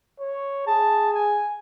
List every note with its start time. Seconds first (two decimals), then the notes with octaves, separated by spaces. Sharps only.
0.19 C#5
0.67 G#4 A5
1.14 G#5